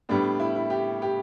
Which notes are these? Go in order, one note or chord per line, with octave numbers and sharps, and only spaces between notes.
A2 G3 B3 D4
E4
E4
G4
G4